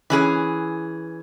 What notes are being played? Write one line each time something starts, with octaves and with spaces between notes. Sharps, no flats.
E3 C#4 G#4